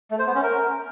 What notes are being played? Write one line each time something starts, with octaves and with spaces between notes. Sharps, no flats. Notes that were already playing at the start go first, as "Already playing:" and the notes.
A3
C5
B3
C#4
A#4